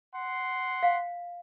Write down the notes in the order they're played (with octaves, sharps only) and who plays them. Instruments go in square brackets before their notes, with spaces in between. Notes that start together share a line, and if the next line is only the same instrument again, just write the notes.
[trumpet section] F#5 C6
[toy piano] F5